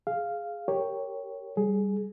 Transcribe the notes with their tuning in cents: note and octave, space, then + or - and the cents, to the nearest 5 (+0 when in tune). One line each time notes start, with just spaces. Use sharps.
G#4 +0 F5 -5
G4 +0 A#4 -20 C#5 +0
G3 +5 G#4 +15